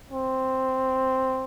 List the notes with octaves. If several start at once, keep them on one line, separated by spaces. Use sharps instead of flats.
C4